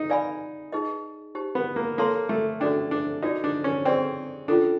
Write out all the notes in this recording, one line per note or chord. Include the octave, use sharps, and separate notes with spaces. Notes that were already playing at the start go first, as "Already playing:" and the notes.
Already playing: D#4
B4 D5 F5 G#5 B5
D#4 G#4 B4 D#5
D#4 G4 C5
B3
A#3
A#3 A4 C#5 F5 A5 C6
A3
C#4 D4 F#4 A4 D5 G5
D4
D#4 F#4 B4 D5
D4
C#4
C4 G#4 B4 D5 G5
C#4 D4 F4 A4